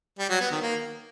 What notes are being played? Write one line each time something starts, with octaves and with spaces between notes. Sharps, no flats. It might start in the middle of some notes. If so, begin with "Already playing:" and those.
G3
F#3
B3
D#3
A#3